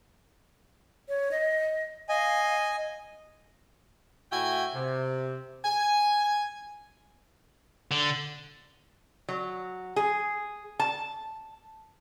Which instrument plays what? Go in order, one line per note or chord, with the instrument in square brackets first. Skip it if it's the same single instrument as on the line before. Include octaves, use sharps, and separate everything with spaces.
[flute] C#5
D#5
[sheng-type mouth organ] D#5 G#5 [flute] F5
[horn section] A2 E4 F#4 E5 G5 G#5
C3
G#5
[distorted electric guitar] D3
[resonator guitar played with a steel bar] F#3
G#4
A5